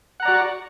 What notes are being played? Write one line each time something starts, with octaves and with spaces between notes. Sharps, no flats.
F#4 D5 F#5 A#5